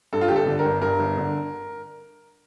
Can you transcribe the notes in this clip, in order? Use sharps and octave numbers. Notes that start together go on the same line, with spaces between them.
G2 A4
F4
G1 G4
A4
D3
A#4
G1
G2 A#4
G1
D3